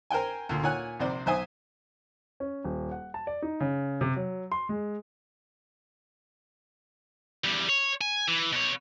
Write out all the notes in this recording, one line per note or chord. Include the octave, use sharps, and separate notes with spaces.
A#4 C5 G5 G#5
D2 A#2
A#2 C#5 F#5 G#5 F#6
A#1 C3 C5 D5
B1 C5 E5 G#5 D#6
C#4
D#1
F#5
A5
D5
D#4
C#3
C3
F#3
C6
G#3
E2 G3
C#5
G#5
E3
B2 C#5